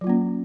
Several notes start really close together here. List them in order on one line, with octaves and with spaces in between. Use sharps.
F#3 F4 A#3 C#4